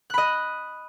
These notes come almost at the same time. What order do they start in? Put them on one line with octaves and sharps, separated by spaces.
F#6 B5 D#5